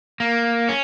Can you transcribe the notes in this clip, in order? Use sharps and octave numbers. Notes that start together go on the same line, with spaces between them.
A#3
C#4